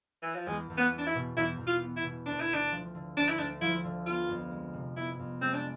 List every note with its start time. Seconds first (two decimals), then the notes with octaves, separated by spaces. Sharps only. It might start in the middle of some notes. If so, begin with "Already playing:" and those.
0.22 E3
0.35 F3
0.46 E2 G#3
0.70 E2
0.78 B3
0.92 B3
0.98 D4
1.07 E4
1.15 B2
1.36 E2 E4
1.60 E2
1.67 F4
1.82 B3
1.97 E4
2.04 B2
2.26 D2 D4
2.40 E4
2.49 D2 D4
2.71 F3
2.95 D3
3.17 D2 D4
3.29 E4
3.38 D2 D4
3.61 F3 E4
3.84 D3
4.06 B3 F4
4.28 F2
4.51 G#3
4.73 C3
4.96 B3 E4
5.19 F2
5.41 G#3 C4
5.54 D4